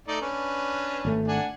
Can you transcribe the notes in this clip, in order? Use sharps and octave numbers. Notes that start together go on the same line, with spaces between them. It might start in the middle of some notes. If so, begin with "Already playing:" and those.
A3 D#4 D5
C#4 D4 B4
G#1 A3
D4 F#5 G#5